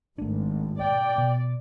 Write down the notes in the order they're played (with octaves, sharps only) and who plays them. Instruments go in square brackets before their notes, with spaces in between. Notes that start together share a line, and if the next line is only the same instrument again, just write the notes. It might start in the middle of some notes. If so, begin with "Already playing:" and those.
[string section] G#1 [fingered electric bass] A3 D4
[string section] D5 [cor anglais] G5
[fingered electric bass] B2